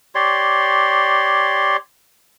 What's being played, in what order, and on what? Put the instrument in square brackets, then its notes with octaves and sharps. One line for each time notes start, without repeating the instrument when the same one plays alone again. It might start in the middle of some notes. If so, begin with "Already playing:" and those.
[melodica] G4 C#5 D5 C6